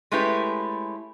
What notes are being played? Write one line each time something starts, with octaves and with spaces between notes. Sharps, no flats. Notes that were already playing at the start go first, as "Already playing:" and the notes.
G#3 A3 C#4 E4 G4 B4